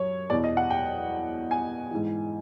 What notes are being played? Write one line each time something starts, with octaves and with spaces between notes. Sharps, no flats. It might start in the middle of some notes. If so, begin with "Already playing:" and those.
Already playing: F#2 C#5
E2 B2 D5
D#5
F#5
G5
G#5
G#2 E3